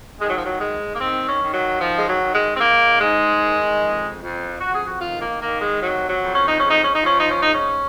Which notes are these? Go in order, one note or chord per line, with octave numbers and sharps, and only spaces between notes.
D#3 G#3
F#3
F3
F#3
G#2 G#3
A#3
D#3 C4
C#4
D#3
F#3
D#3 F3
G#3
F#3
D#3
G#3
C4
G#2 A#3
G#2 G#3
D#3
F2
F2
F2 F#4
G#4
F#4
D#3 F4
A#3
D#3 A#3
G#3
C3 F#3
F#3
F2
C#4
D#4
G#2 C#4
D#4
C#4
D#4
F3
C#4
D#4
C#4
G#2 D#4
C#4